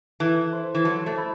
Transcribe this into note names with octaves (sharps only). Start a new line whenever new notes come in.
E3 A4
C5
E3
F#3 A4
A3
E4